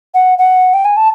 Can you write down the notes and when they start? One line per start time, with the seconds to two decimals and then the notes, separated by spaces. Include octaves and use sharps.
0.14 F#5
0.38 F#5
0.74 G5
0.85 G#5
0.97 A5